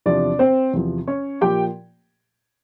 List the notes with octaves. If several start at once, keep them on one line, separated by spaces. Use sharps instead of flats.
E2 C3 F3 D4 D5
C4 C5
E2 C3 F3
C#4 C#5
A#2 F3 G4 G5